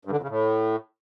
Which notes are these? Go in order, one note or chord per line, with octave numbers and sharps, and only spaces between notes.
G2
D3
F2
C#3
A2